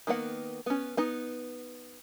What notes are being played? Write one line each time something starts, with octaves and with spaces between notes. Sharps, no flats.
D#3 A#3 B3 F#5
B3 C#4
B3 D#4